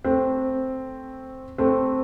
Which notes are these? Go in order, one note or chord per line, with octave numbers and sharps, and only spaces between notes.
A3 C4
A3 C4